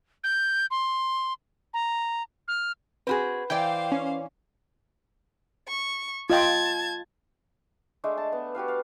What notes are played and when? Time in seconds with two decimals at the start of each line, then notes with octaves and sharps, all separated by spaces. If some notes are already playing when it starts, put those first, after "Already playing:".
0.24 G6
0.71 C6
1.74 A#5
2.48 F6
3.07 C4 F#4 G#4 B4 B5
3.50 E3 C5 D5 F5 G5
3.92 C#4
5.68 C#6
6.30 F4 D#5 G5 A5 G#6
8.04 G#3 A3 D4
8.17 A5
8.32 B3
8.55 F#4 G4 B4 F5
8.68 F5